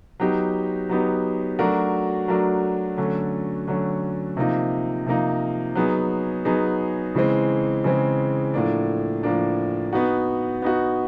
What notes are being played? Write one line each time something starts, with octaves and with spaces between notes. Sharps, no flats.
F#3 B3 D#4 G4
F#3 B3 D#4 G4
F#3 A3 D4 F#4 A#4
F#3 A3 D4 F#4 A#4
D3 F#3 A3 C#4
D3 F#3 A3 C#4
C3 F3 A#3 D#4
C3 F3 A#3 D#4
F#3 B3 D#4 G#4
F#3 B3 D#4 G#4
C#3 E3 G#3 C4
C#3 E3 G#3 C4
A2 F3 A#3 D4
A2 F3 A#3 D4
B3 D#4 F#4
B3 D#4 F#4